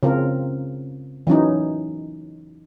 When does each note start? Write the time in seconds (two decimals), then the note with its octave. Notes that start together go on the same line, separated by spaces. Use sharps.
0.03 C#3 C4 F4 A#4
1.27 E3 F#3 C#4 D#4